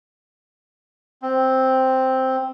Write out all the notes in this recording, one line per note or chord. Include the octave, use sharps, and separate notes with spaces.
C4